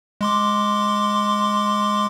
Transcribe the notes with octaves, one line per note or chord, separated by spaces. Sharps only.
G#3 C6 D6